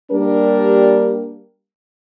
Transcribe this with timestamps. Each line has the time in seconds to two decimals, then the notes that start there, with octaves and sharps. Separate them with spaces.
0.12 G3 A#3 D4 G4 A#4